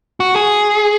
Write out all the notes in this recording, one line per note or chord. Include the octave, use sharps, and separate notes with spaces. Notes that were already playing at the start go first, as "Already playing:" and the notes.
F#4
G#4